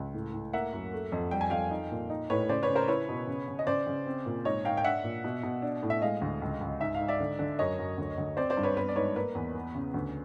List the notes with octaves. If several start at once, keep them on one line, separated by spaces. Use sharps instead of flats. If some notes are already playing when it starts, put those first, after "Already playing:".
Already playing: C#2
A2
A2
A#3 E5 F#5
F#2
A3
F2
G3 G5
G#5
F2 F5 G5
D#4
A#2
D#4
A2 B4 C#5
C#3 C5 D5
B4 C#5
C#3
A#4 C5
E4 B4 C#5
B2
C#3
C#3
D#5
C#3 C5 D5
C#3
C4
A#2
G#2 C#5 D#5
G#2 F5 G5
G5
D4 E5 F#5
A#2
B2
B2
D4
A2
E5
G#3 D#5 F5
D2
C#2
C#2
G#2 E5
F5
G#2
D5 E5
D3
D3
F#2 C#5 D#5
F#2
D2
D2
C4 C5 D5
C5 D5
G2
B4 C#5
B3 B4
D5
G#2 B4 C#5
A#3 B4
E2
B3
C#3
D2